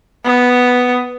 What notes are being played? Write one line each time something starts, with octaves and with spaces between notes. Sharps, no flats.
B3